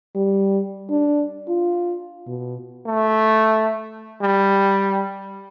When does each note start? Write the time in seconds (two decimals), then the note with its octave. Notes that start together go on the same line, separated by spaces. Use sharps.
0.15 G3
0.90 D4
1.48 F4
2.27 B2
2.86 A3
4.21 G3